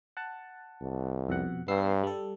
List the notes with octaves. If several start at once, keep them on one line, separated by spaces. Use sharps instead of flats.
F#5 A5
C2
F2 B2 F#5
G2 B3 E6 C7
G3 A4